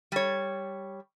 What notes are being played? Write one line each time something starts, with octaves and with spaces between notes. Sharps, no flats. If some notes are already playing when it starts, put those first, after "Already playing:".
G3 C#5